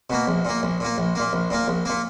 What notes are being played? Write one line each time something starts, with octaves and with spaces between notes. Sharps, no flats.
B2 A#3
A#1
A#2 A#3
A#1
A#2 A#3
A#1
A#2 A#3
A#1
A#2 A#3
A#1
A#2 A#3